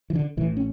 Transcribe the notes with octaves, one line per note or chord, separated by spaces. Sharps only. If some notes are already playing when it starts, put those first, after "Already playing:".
E3
D3
A1 A2 E3
C#4